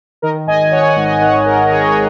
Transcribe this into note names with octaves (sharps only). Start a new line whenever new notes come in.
D#3 A#4 D#5
G#1 D#5 G#5
G#1 C#5 F#5
G#5
C#5 F#5
G#2
D#5 G#5
D#3 C#5 F#5
G#1 A#4 D#5
D#5
G#1 G#4 C#5
D#5
G#4 C#5